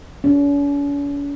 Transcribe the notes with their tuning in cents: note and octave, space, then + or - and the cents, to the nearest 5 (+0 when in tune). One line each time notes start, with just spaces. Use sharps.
C#4 +45